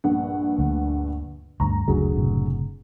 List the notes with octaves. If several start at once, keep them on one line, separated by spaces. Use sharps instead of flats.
A#1 G2 F#5
D2
D2 G2 A#5
F#1 D2 D3 F#3 G#4
F#1 A2 C3